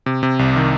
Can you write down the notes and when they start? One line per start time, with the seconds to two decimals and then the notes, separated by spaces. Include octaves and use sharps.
0.06 C3
0.23 C3
0.39 C2
0.56 D#3